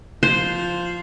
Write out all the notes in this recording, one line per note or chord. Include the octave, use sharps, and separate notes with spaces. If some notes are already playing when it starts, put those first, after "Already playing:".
F3 C5